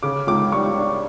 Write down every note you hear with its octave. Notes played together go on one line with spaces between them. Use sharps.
C#3 D6
C#2 D6
G3 C#6
D4